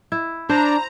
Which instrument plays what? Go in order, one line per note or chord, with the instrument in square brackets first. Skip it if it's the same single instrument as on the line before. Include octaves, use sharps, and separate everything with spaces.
[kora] E4
[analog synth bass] D4 [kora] C5 [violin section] A#5